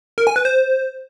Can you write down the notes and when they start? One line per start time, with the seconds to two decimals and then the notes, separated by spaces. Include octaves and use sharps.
0.18 A#4
0.27 G#5
0.36 B4
0.45 C5